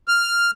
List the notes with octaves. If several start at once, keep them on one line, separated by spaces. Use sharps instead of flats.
F6